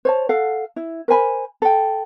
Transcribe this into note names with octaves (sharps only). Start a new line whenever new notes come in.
C5 C#5 A5
A4 F5 F#5
E4
A#4 C5 G#5 B5
A4 G5